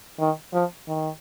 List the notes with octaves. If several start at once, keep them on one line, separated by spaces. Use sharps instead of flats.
D#3
F3
D#3